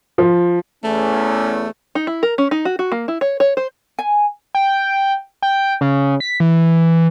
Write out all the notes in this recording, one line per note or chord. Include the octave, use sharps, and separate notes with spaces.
F3
E2 A3 C#4
D#4
E4
A#4
C#4
D#4
F#4
F#4
A#3
E4
C#5
C#5
C5
G#5
G5
G5
C#3
B6
E3